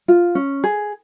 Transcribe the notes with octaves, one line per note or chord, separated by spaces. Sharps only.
F4
C#4
G#4